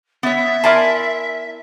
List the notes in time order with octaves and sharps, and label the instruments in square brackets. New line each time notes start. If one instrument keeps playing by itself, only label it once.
[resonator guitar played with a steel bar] B3 C#5 [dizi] E5
[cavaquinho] E4 G#5 C6 [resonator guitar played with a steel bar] A#4 D5 A5